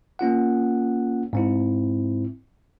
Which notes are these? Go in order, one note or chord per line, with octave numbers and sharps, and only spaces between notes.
A#3 C#4 F4 F#5
G#2 C4 E4